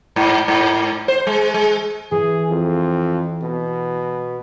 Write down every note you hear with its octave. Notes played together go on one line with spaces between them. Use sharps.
G#2
G#2
C5
G#3
G#3
E3 G#4
F2
B2